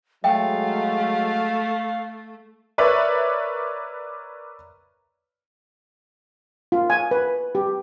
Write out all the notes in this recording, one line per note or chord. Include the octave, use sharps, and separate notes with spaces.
F#3 G#3 A3 E5 F5 G5
A#4 B4 C#5 D5 E5
F4
G#5
B4
G4